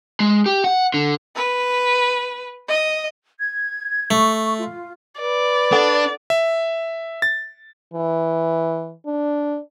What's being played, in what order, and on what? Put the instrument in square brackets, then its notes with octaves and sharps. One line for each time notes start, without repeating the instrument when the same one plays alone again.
[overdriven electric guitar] G#3
G4
F#5
D3
[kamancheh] B4
D#5
[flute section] G#6
[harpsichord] A3 [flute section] C#6
[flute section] F4
[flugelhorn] B4 [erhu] D5
[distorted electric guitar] D4 [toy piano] A4 F#5
[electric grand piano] E5
A6
[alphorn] E3
D4